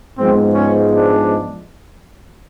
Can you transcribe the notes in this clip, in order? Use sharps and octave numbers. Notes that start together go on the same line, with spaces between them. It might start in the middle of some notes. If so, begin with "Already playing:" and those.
G#2 F3 G#3 B3 C4
C#4
D4